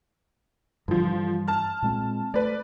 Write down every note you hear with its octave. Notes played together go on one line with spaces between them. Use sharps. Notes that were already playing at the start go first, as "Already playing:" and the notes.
G2 D3 E3 F3
A5 F6
A#2 G#3 C4
A3 B4 D5